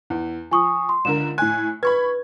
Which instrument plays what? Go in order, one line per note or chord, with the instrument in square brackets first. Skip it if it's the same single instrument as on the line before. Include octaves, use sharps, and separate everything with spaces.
[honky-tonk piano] E2
[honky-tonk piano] F3 [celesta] G#5 C#6 D#6
[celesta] C6
[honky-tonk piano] C#2 D3 A#4 [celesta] E7
[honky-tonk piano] A2 G#5 [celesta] F#6
[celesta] B4 [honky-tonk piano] B5 C#6 G#6